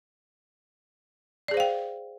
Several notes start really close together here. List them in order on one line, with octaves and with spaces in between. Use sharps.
D5 G#4 C5 F5 G5